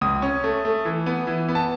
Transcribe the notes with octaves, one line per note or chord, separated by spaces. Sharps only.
C#2 D#6
C#4
A3
A3
E3
B3
E3
B3
A5